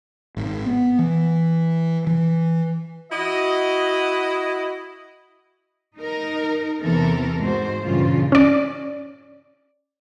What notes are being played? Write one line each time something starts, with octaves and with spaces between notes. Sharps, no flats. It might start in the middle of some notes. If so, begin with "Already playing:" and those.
G#1
B3
E3
E3
E4 F#4 D#5
D#4 A#4
E2 C3 E3 B3 A4 A#4
G#2 F#4 C5
G2 A#2 C#3 E3 F4
C#4 D5